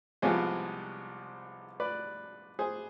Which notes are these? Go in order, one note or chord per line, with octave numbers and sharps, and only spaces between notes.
C2 C3 F3 G#3 B3 G#4 C5
B4 D5
G#4 C5